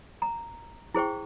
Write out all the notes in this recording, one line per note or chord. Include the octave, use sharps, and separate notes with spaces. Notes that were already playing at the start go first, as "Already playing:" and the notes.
A#5
E4 G#4 C5 G5 C#6